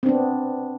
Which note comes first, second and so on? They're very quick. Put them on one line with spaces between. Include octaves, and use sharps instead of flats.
C4 D4 B3